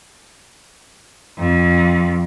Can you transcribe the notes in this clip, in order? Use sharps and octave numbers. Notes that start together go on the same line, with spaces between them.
F2